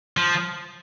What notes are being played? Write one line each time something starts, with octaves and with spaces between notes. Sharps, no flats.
F3